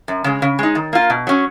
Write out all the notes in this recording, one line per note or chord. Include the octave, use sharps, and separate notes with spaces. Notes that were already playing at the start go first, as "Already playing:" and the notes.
F#2
C#3 G#3
C#3
G#3 D#4
D#3
A#3 F4
B2
F#3 C#4